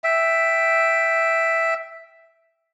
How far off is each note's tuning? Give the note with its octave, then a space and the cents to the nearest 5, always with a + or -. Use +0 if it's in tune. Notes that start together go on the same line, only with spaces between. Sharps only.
E5 +0 G5 +0